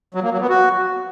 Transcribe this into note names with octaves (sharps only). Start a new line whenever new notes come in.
F#3
A#3
F#3
B3
F#4